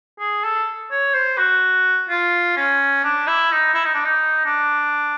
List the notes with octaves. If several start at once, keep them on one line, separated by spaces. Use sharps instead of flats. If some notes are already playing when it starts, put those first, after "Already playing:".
G#4
A4
C#5
C5
F#4
F4
C#4
D4
E4
D#4
E4
D#4
D4
D#4
D4